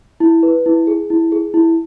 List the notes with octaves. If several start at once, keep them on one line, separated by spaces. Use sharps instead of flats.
E4
B4
E4
G#4
E4
G#4
E4